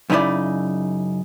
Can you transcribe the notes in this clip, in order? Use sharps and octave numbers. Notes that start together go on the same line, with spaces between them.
F#2 C#3 D#4 E4 D5